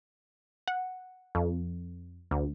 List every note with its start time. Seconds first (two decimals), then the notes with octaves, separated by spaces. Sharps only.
0.68 F#5
1.35 F2
2.31 D2